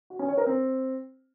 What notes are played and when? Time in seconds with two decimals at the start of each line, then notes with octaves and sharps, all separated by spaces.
0.10 F#4
0.19 C#4
0.28 C#5
0.38 A#4
0.47 C4